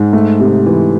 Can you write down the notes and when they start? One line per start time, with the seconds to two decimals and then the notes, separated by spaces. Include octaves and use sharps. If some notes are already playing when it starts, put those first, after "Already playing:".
Already playing: G#2
0.13 A3
0.40 C3
0.66 E3